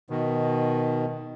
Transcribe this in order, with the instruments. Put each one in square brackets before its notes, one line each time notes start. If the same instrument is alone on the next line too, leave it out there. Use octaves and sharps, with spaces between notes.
[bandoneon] B2 D#3